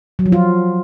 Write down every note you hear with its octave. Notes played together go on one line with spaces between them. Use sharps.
F#3
F3
F4